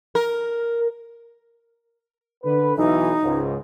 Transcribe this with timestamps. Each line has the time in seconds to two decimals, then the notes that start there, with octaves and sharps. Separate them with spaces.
0.15 A#4
2.44 D3 B4
2.76 B1 E3 D#4
3.23 C#2 G#2